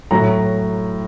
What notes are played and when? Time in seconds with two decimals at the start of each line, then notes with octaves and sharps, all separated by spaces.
0.11 A2 F#3 A#5